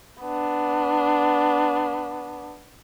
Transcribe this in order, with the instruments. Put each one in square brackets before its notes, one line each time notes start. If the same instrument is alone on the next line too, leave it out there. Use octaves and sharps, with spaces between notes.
[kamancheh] B3 D4